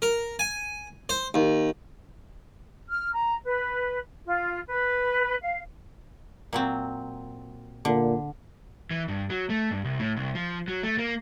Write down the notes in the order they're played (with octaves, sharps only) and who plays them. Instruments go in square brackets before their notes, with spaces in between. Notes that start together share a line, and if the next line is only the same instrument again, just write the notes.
[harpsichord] A#4
G#5
C5
D#2
[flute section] F6
A#5
B4
F4
B4
F5
[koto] A#2 F#3 C4
[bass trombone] A#2 [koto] D3
[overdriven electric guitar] E3
G2
F#3
A3
G2
C2
A2
C2
F3
F#3
A3
A#3